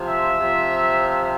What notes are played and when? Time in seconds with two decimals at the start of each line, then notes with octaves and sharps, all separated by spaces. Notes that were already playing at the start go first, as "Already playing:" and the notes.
Already playing: C3 F3
0.08 E5
0.38 C3 F3